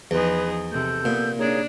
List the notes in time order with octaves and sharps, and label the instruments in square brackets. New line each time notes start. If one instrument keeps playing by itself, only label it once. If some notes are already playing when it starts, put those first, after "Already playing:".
[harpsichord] E2 [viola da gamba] F3 D#4 G#4 [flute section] B4
[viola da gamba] C3 [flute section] A4 G6
[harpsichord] A#2 [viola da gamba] B3
[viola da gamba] A#3 D4 [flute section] D#4 G#4 C#5